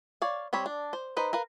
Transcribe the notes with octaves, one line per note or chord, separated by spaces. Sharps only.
C#5 D5 F5
G3 C4 C#5 B5
D4
C5
D#4 B4 C5
A#4 B4 F5